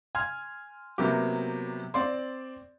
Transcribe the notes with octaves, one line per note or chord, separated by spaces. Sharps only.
G#5 C6 F6 G#6
C3 F#3 A#3 B3 G4
C4 D5 C6